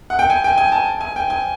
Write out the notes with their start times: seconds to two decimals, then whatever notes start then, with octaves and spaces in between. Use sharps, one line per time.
0.10 F#5
0.19 G5
0.30 G#5
0.44 G5
0.58 G#5
0.72 A5
1.01 G#5
1.16 G5
1.30 G#5